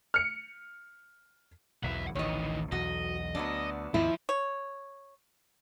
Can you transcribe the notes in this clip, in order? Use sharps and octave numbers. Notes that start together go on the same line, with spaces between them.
F6 C#7
B1 E2 E3 E5 F#5
A1 D2 D#3 E3 C#5 D#5
B1 E2 F#4 D#5
D2 F#3 B3 D4
D#2 G#2 F3 E4
C#5